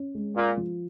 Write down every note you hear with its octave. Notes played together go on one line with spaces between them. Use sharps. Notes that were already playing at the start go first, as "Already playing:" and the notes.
Already playing: C#4
G#3
A#2 F4
F3